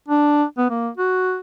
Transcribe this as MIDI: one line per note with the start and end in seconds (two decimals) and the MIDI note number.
0.08 0.44 62
0.58 0.66 59
0.70 0.89 58
0.97 1.39 66